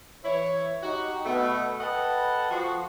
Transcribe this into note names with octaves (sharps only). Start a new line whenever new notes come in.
E3 E4 C#5
D#4 F#4 G4
B2 A3 B3
A4 B4 D#5 F#5 G5 A5
F3 F#4